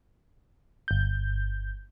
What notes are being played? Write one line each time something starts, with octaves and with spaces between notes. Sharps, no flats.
G1 G6